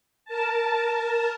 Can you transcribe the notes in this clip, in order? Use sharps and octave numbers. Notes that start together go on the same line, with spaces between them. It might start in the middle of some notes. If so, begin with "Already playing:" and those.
A#4 A5